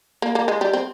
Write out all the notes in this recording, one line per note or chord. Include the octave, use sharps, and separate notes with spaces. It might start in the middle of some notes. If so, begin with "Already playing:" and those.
A#3
A#3
G#3
G3
C4